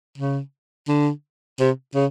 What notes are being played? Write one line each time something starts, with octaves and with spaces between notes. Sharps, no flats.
C#3
D3
C3
C#3